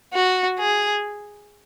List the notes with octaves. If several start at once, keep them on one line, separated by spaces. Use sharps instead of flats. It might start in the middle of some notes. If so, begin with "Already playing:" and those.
F#4
G#4